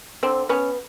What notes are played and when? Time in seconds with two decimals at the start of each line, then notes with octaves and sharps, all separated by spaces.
0.23 D3 C4
0.49 B3 C#4